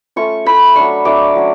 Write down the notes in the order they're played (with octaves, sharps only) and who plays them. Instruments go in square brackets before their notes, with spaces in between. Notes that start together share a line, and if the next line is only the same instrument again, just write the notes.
[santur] A3 C#4 F4 C#6
A3 C#4 F4 B5
F#3 A3 D4 C#6
F#3 A3 D4 D6
F#3 C#4